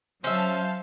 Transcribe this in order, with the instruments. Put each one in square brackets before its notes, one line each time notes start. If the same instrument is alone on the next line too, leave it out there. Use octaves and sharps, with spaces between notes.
[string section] F#3 F5 A5 [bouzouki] C#4 E5 [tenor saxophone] C5